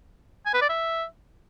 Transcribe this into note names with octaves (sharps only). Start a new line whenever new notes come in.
G#5
B4
D5
E5